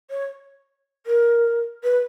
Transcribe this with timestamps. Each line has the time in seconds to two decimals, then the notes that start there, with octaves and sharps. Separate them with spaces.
0.10 C#5
1.06 A#4
1.83 B4